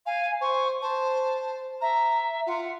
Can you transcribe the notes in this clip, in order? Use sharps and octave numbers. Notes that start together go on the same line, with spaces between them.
F5 G#5
C5 C#6
C5 A5
E5 A#5
F4 F#5